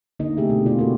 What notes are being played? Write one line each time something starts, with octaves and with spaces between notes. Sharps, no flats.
D3 A#3 D#4 D#5
C3 A3 G4 G#4 E5
B2
C3 E4 F4 D5
A#3 F#4 A4